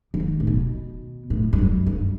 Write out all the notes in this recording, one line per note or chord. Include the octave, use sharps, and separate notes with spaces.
E3
D#3
A2
B2
A2
G2
F#2
G2